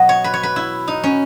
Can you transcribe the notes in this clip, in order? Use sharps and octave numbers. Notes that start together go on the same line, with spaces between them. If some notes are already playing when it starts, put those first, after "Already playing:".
Already playing: B2 F#3 B3 D#5
C#5
B4
C#5
B4
E4
D#4
C#4